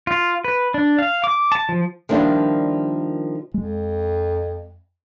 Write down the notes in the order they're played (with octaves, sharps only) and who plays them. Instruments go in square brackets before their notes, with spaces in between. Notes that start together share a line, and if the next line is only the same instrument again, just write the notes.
[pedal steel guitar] F4
B4
D4
F5
D6
A5
F3
[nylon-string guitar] D#3 F3 G3 A#3 D4 E4
[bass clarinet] F2 [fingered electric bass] G#3